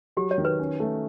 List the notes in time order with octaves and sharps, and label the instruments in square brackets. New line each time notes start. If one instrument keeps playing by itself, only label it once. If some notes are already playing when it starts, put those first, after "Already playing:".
[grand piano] F#3 [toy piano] G4
[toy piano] C#5
[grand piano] D#3
[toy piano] B4
[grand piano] C#4
A3